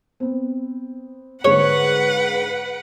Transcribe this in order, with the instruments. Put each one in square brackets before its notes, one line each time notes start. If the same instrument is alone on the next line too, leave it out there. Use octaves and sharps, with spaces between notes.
[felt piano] B3 C4
[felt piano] G#2 D3 [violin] B4 F#5 [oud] C#5